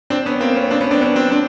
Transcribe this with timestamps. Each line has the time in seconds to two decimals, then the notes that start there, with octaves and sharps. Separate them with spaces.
0.10 C4 D4
0.25 B3 C#4
0.40 A#3 C4
0.55 B3 C#4
0.70 C4 D4
0.81 B3 C#4
0.91 C4 D4
1.01 B3 C#4
1.16 C4 D4
1.31 C4 D4